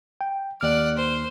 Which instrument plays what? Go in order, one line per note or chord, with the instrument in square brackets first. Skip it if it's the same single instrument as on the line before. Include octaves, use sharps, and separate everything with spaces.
[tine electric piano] G5
[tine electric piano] D#2 F6 [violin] D5 F#5
[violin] C5